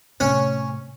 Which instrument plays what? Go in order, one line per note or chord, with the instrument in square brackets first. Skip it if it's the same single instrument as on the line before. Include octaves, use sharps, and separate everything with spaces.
[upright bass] A2 C3 [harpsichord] C#4